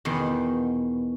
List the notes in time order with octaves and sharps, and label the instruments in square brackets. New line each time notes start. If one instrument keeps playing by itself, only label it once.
[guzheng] E2 B2 D#3